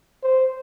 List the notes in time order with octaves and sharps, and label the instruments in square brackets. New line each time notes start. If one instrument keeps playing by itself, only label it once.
[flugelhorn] C5